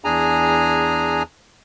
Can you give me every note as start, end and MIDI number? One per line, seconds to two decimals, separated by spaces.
0.04 1.23 40
0.04 1.23 62
0.04 1.23 68
0.04 1.23 80
0.04 1.23 82